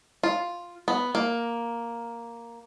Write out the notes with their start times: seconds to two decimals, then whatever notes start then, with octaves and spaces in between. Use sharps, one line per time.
0.23 F4
0.88 B3
1.15 A#3